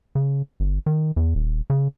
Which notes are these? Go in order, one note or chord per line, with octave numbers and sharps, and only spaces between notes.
C#3
G1
D#3
E2
D#1
C#3